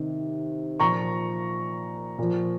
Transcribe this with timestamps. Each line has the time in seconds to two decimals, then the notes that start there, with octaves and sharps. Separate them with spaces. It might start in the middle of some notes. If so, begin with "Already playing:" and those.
Already playing: C3 D#3
0.80 A#2 F3 A#5 C#6
2.19 A#2 F3